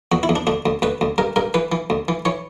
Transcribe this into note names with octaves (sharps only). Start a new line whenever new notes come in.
E2 F#4
E4
E2
D4
D2 D4
D2
D2 B4
D2
G2 A#4
G2 A#4
E3 B4
E3
D2
E3
E3 C#5